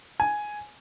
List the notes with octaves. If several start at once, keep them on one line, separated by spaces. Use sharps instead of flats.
G#5